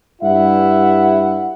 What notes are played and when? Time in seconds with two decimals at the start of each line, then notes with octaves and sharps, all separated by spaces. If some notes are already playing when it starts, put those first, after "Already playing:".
0.22 G2 E4 E5 F#5